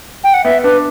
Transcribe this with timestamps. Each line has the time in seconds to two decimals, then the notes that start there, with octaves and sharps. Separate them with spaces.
0.24 G5
0.34 F#5
0.44 B3 E5
0.64 D4 B4